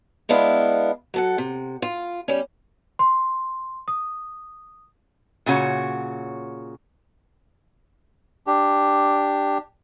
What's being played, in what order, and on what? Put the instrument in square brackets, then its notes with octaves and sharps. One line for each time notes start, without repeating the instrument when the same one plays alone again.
[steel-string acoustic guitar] G#3 B3 D4 E4 F5
F#3 A4 F#5
C3
F4
G3 C#4
[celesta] C6
D#6
[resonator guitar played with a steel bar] A#2 C#3 F#4 C#5
[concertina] D4 G4